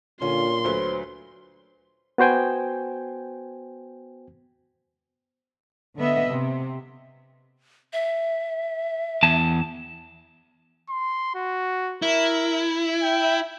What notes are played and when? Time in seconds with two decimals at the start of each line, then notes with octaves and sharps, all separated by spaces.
0.22 A#2 D3 C#4 F4 C6
0.64 D2 F#3 B4 C5
2.18 B3 F#4 C5 G5 G#5
5.96 D3 B3 D#5 E5
6.27 C3
7.93 E5
9.23 E2 A5
10.89 C6
11.35 F#4
12.02 E4 A#4
13.02 G5